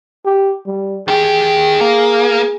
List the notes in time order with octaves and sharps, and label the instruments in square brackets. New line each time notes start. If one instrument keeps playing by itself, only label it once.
[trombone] G4
G3
[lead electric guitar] D#3 G4 [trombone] G#4
[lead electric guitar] A#3